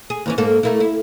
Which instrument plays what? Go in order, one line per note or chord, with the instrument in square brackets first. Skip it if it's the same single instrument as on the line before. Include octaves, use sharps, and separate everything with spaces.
[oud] G#4
D#2 E3 C#4
G#2 A#3 A4
A3 A#3 E4
E4